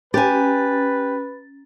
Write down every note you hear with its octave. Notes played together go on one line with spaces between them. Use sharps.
C#4 G4 B4 G#5 A6